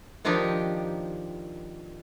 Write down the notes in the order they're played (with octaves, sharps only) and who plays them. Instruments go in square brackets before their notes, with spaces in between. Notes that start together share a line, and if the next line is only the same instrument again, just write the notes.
[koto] D#3 F3 D4 D#4 G4